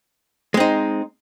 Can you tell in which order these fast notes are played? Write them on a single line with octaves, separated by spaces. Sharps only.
G#3 C4 D#4